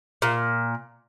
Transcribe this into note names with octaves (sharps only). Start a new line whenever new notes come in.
A#2